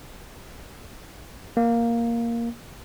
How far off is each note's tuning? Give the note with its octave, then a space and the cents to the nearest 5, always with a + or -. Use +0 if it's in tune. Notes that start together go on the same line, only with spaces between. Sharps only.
A#3 +0